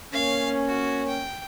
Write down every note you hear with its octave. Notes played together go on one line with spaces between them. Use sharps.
A#3 C#4 A#4 C#5 F5
F#4
G5